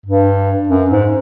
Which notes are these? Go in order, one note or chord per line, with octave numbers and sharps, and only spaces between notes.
G2
F#2
G#2